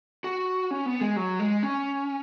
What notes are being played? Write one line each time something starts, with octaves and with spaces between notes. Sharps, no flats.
F#4
C#4
B3
G#3
F#3
G#3
C#4